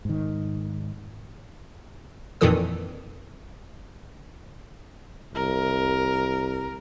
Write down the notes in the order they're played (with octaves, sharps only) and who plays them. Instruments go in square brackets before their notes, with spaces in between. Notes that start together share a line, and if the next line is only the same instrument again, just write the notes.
[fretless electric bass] G#2 D#3
[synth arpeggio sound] F2 A#2 D#3 E3 A4 D#6
[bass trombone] C2 [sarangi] A#4